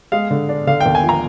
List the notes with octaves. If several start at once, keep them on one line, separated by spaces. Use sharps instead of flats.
G#3 F5
D3
D4
D3 F5
G5
D#2
G#5
F3
A#5